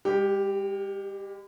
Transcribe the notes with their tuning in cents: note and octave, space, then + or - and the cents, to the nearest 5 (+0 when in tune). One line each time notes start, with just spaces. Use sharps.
G#3 -45 G4 +0